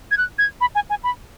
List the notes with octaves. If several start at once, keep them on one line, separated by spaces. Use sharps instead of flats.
G#6
F#6
G#6
B5
G#5
G#5
B5